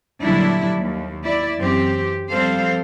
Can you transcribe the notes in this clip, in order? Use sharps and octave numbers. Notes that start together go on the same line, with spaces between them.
A#2 D3 F#3 G3 D4 E4
D#2
E4 D5
F#2 E3 C4 G4
F3 G3 C4 A4 C5 F5